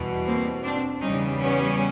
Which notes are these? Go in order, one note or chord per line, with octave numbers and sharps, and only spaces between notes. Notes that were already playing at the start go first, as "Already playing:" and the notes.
Already playing: E2 B2 G3
A#3 C4
C4 D4
E2 C#3 E3 G3 C#4 D#4
B3 C#4